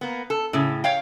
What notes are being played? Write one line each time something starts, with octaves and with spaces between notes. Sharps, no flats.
A#3 B3
A4
A2 C#3
C#5 F5 G5